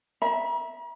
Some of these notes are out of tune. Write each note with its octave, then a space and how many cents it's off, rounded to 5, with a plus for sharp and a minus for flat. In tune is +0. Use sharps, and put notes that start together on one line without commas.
E5 +0 A#5 +45